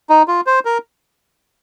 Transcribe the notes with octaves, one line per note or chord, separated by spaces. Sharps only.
D#4
F4
C5
A#4